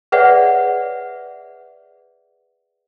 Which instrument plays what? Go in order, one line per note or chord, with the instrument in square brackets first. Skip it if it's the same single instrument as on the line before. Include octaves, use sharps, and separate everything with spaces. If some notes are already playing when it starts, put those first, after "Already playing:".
[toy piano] G#4 B4 C#5 D5 E5 F#5